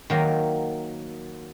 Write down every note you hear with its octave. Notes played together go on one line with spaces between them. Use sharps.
D#3 F#3 A#3